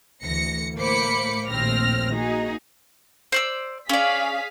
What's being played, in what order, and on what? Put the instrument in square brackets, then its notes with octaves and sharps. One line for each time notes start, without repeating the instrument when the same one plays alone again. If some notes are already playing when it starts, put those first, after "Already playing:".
[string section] D2 E3 A#6 C#7
A2 A#3 C5 B5 D6 C#7
A#1 D#2 A2 C4 F6 A#6
A#3 D#4 F#4 G#4
[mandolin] C5 D5 E6
[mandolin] C#4 D5 [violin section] G#4 F5 B6